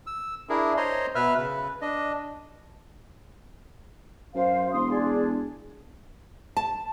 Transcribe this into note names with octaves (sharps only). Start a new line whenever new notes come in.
E6
D4 E4 G#4 A#4
C5 C#5 D#5 A#5 C6
B2 B4 E5 F6
C#3 B4
D4 D#5
F#2 C5 F5
E1 C6 D#6
D4 G#4 D5
A5